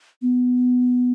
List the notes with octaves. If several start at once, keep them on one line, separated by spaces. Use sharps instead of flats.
B3